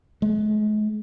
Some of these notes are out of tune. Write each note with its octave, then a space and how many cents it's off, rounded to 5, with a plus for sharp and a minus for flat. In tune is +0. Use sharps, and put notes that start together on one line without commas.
G#3 +40